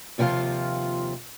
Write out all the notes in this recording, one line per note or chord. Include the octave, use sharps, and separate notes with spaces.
D#2 C3 F3 A3 F4 F5